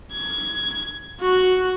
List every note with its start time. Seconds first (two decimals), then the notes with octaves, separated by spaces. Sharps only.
0.12 G#6
1.21 F#4